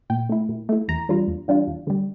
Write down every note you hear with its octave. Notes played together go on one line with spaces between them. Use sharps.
A#2 G5
A3 E4
A#2
A3 E4
E2 A#5
E3 G3 D4 F4
E2
E3 G3 D4 F4
E2
D3 G3